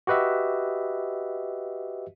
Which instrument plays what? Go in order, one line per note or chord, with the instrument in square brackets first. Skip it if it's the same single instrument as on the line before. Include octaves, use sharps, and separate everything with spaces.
[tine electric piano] F#4 G4 B4 D#5 E5